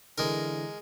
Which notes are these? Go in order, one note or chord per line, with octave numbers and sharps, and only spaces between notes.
D3 E3 G#3 A#4